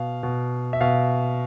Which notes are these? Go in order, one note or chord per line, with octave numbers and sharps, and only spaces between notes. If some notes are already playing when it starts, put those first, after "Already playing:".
Already playing: B2 F5
B2
E5
B2 F5